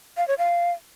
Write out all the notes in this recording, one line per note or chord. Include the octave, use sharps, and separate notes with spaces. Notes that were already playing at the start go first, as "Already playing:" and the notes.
F5
C#5
F5